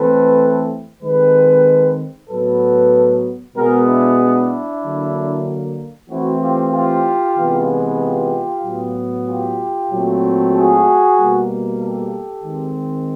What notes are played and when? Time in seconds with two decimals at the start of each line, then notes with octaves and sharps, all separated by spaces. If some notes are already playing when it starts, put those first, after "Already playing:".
Already playing: E3 A3 C4 A4 B4
1.02 D#3 G#3 C4 A4 B4
2.29 A2 F#3 B3 A4 B4
3.56 B2 G#3 B3 G#4 A#4
3.87 D4 E4
4.19 D4 E4
4.83 D3 F#3 A#3
6.10 E3 A3 C4 E4 F#4
6.41 F4 G4
6.73 F4 G4
7.37 C3 E3 G#3 B3
8.00 F4 G4
8.63 A2 F#3 B3
9.27 F4 G4
9.90 A#2 F#3 A3 C4
10.54 F#4 G#4
11.17 B2 G3 A#3
11.80 G4 A4
12.44 D#3 G#3 C4